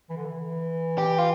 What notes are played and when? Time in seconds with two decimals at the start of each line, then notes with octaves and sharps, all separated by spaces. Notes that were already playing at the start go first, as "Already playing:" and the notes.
0.10 E3
0.17 D3
0.25 E3
0.98 G4
1.18 F4